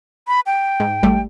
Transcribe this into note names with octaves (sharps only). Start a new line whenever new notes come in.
B5
G5
G#2
G#1 G3 A3